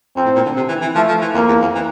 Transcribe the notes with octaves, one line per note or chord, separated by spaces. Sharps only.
F2 C4
A2
A#2
D3
C3
E3
E3
F3 A3
F3
E3
F2 A#3
E2
F2
E3